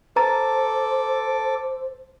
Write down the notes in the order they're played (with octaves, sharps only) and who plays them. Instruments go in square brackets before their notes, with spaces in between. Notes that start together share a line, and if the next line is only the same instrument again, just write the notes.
[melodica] A4 D6 [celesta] B4 A#5 A6 [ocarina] C5